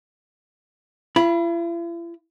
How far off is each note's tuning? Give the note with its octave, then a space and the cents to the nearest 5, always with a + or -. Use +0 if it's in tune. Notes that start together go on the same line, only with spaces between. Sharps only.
E4 +45 B5 -10